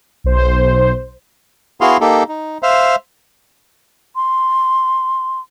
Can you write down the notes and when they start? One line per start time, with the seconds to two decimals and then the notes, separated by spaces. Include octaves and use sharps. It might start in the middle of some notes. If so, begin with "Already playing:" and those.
0.24 B1 C5
1.81 B3 E4 F#4 G#4 F5 C6
2.01 A#3 D#4 G4 A4
2.28 D#4
2.63 C5 E5 F5
4.16 C6